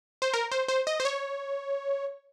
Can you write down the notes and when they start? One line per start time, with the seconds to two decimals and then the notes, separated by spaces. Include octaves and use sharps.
0.22 C5
0.34 A#4
0.52 C5
0.68 C5
0.87 D#5
1.00 C5
1.05 C#5